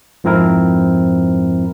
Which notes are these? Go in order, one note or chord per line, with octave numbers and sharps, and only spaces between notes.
F2 G#2 F3 C4 E4 A#4